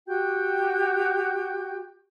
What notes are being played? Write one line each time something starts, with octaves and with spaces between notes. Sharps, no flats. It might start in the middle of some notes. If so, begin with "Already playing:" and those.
F#4 G4 G5 G6